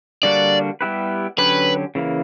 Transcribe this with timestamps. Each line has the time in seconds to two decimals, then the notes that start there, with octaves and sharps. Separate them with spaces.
0.23 D3 G3 A#3 D4 F#4 D5
0.81 G3 B3 E4 G4 B4
1.38 D3 F#3 C#4 G4 B4
1.95 C#3 E3 A#3